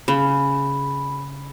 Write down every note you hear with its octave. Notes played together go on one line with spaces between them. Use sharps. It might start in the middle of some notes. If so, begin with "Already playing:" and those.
C#3 B5